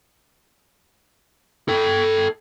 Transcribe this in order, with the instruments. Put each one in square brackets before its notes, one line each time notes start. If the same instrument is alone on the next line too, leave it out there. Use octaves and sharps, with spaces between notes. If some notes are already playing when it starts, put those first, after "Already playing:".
[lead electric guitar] A4 G5